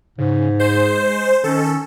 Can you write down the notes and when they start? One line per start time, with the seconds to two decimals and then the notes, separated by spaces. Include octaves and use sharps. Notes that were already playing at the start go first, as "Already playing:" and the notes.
0.18 G#2 C#3
0.59 G#3 C5
1.44 D#3 C#4 A4